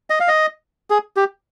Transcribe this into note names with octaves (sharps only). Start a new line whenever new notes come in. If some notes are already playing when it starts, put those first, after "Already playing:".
D#5
F5
D#5
G#4
G4